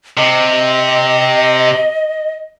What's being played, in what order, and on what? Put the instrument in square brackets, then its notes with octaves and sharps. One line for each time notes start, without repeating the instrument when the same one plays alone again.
[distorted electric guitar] C3 [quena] D#5